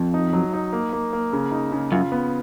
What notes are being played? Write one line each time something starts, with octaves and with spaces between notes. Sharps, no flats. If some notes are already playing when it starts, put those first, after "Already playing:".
Already playing: F2
D#4
F#3
D#4
A#3
A#3
A#3
C#3
D#4
C#3
F#2 F4
B3